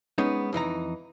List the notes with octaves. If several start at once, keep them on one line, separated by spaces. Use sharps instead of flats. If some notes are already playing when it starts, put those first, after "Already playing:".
G#3 B3 C#4 D#4
F2 E3 D#4 A#5